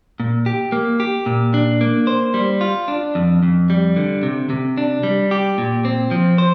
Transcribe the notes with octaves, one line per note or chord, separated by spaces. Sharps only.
A#2
G4
A#3
G4
A#2
D4
A#3
C5
G3
F4
D4
F2
F2
G3
D3
C3
C3
D4
G3
G4
A#2
C4
F3
C5